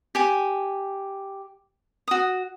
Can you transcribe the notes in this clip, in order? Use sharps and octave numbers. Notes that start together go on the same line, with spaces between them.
G4 G#5
F#4 D#6